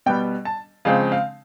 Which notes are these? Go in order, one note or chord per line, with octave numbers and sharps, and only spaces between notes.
B2 G3 B3 G5
A5
C#3 F3 G#3 C4 F5
F5